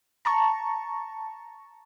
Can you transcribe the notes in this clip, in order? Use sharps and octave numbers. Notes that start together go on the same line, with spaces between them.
A5 A#5 C#6